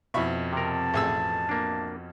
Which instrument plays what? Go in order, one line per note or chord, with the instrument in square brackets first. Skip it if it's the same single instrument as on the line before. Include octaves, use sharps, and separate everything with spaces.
[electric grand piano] F2 B2 [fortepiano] E4 B5 C#6
[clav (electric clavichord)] C3 A#4 [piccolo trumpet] A5
[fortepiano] A1 G#4 E6
[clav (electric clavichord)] A#3 D4